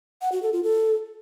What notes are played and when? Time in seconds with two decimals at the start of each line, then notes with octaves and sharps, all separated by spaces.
0.22 F#5
0.32 F#4
0.42 A4
0.53 F4
0.63 A4